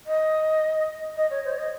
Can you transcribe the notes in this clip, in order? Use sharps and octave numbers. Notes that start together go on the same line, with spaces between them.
D#5
D#5
C#5
C5
C#5
D#5